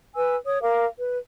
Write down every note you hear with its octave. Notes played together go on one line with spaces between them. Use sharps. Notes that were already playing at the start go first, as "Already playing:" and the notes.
B4 G#5 E6
C#5 D#6
A#4 F5 D6
B4